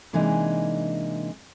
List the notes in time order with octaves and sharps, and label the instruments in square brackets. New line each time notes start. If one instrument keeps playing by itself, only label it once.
[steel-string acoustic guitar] C3 E3 G#3 A#3 D4 D#4